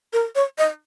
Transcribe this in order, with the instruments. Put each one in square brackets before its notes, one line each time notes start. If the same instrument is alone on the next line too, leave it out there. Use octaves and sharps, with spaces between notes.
[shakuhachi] A#4
C#5
D#5